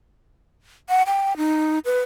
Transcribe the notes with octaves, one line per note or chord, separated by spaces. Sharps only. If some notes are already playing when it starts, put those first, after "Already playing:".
F#5
G5
D#4
B4